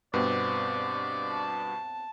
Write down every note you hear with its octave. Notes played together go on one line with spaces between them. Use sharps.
G2 B2 B3 C4 D5
A5